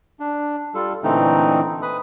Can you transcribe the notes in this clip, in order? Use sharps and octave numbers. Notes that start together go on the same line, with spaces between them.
D4
G3 F4 A4
A#2 D3 E3 A3 C4 D#4
B4 B5 D#6